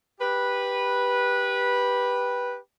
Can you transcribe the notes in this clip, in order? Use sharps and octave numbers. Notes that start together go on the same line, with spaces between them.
G4 B4